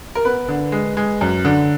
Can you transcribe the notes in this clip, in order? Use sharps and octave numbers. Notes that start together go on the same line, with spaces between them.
A#4
B3 B4
D3
G#3
G#3
F#2
D3